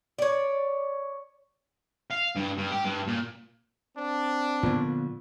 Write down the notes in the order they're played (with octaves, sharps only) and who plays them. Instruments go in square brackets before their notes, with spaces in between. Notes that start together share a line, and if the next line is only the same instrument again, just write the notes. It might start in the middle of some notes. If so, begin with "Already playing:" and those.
[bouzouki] C#5 D5
[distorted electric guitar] F5
G2
G2
G4
G2
A#2
[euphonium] C4 [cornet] D4
[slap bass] A#2 D3 F3 [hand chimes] B3 F4